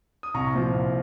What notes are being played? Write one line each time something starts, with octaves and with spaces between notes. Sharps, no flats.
D#6
C2 A#5 C#6
A#2 F3
C2